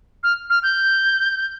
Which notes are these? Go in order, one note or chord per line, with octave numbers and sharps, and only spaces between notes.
F6
F6
G6